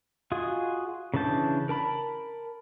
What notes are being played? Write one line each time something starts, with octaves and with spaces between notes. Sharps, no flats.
F4 F#4 G#4 D#5 G#5
C#3 E3 D4 A5 G6
A#4 A5 B5